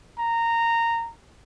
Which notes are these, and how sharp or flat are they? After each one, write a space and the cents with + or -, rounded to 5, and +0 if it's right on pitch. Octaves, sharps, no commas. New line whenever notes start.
A#5 -15